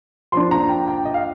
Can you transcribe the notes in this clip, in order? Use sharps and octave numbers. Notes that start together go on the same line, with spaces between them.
F3 A#3 D4 C6
A#5
G5
G5
D#5
F5